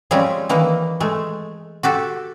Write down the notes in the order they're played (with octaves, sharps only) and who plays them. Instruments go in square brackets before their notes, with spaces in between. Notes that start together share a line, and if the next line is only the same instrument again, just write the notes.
[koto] F3 G3 G#3 C4 C#4 G4
D#3 E3 A#3
G#3 A3
F#4 G4 A4